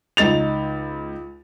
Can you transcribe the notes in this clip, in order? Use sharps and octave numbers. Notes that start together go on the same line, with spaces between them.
C#2 D#4 A6 F7